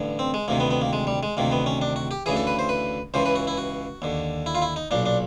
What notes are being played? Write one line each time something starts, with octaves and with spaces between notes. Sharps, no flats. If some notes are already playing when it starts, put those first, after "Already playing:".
Already playing: A1 G2 D3
C4
G#3
D2 C3 D#3 A#3
B3
B3
A#3
G#3
G3
G#3
D2 C3 D#3 A#3
B3
C#4
D4
F#4
G4
D2 C#3 E3 G#4
A4
B4
C5
B4
C#2 C#3 E3 C5
B4
F#4
E4
F#4
D#2 D3
E4
F4
E4
D#4
B1 A#2 D4
D4